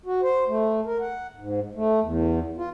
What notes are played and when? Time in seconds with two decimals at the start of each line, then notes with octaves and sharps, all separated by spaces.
0.06 F#4
0.22 C5
0.48 A3
0.86 A#4
1.00 F#5
1.37 G#2
1.75 A3
2.00 E2
2.58 F4